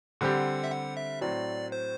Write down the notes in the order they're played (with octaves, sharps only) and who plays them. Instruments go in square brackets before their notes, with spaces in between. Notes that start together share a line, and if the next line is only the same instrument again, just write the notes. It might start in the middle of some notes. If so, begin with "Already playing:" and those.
[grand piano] D3 G3 C4 G4 [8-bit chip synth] F#5
[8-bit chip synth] E5
F#5
E5
[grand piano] A2 F#3 C4 [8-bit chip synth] D5
[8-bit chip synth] C5